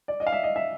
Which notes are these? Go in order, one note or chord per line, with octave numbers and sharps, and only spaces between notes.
D5
D#5
F5
E5
D#5
E5